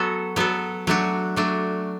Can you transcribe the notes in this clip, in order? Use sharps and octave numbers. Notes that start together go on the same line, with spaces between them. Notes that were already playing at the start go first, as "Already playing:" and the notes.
Already playing: F#3 B3 F#4 A4
F#3 B3 F#4 A4
F#3 A3 D4 F#4
F#3 A3 D4 F#4